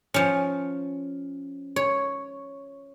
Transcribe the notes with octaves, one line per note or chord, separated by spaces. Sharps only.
F3 C#4
C#5